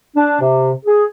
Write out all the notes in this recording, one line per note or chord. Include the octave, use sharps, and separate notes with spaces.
D4
C3
G#4